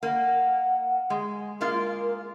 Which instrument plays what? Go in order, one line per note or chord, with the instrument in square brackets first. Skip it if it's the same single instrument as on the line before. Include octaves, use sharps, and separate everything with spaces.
[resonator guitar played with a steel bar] A#3 [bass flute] F#5
[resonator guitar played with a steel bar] G#3
[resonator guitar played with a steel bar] G#3 A#3 F4 [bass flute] A#4